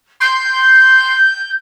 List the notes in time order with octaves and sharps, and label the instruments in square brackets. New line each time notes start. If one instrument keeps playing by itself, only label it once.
[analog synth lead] C6 [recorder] G6